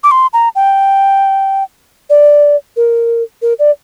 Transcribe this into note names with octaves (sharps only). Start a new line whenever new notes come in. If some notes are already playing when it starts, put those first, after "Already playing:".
D6
C6
A#5
G5
D5
A#4
A#4
D5